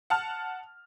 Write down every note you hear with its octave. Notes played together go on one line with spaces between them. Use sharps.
F#5 A5 F6